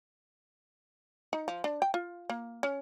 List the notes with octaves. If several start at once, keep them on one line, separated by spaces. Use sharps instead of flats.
D#4
F3
D4
G5
F4
A#3
C#4